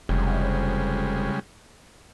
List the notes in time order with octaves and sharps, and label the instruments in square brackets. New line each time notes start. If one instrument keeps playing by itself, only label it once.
[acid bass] F1 [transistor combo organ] C#3 G3 G#3